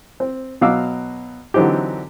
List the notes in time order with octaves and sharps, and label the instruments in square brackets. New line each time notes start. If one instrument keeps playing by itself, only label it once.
[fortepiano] C4
B2 F#3 F5 D6 E6
D3 E3 F#3 C4 D#4 G4